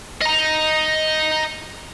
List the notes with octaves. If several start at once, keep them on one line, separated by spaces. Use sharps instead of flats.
D#5 A#5